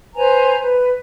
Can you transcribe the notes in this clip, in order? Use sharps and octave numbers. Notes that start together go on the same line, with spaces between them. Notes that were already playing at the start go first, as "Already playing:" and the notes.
B4 C5 G#5 A#5
B4